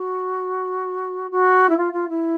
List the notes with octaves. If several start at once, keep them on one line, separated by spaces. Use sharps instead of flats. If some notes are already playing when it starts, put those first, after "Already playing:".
Already playing: F#4
F#4
E4
F4
F4
E4